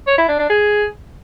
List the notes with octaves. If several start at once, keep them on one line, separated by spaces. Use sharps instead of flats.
C#5
E4
D4
D4
G#4